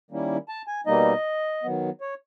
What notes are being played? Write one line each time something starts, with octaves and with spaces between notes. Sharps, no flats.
D#3 G3 A#3 C#4 E4
A5
G#5
B2 G3 A#3 D#4 D#5
D#3 F#3 B3
C#5